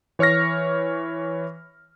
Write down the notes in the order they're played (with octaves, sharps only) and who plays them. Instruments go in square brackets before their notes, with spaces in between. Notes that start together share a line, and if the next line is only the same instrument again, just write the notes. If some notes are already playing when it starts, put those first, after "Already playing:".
[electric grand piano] E3 C#5 C#6 F6 A#6